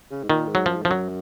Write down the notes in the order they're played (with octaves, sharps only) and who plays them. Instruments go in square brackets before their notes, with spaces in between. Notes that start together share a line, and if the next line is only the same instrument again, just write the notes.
[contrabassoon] C#3
G#2
[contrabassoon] A#2 [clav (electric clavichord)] D#3
[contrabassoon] G#2
[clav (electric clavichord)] F#3
[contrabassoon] F#2 [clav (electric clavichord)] F3
[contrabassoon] G#2
[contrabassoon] F#2 [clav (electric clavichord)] F3
[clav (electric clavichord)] F#3